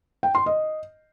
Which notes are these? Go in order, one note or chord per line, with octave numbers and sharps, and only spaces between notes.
G5
C6
D#5